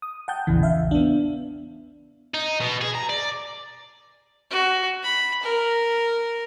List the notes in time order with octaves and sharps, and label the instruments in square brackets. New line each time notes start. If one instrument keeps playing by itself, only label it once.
[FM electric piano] D#6
F#5 G5 A5 G6
A#1 E2 C#3 E3
E5 F5
B3 D4
[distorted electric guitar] D#4
B2
G#4
A#5
D5
[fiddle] F#4
B5
A#4